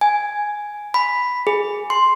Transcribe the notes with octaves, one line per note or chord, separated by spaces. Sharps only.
G#5
B5
G#4
C6